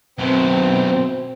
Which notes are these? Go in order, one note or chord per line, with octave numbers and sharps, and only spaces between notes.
F#2 B2 C4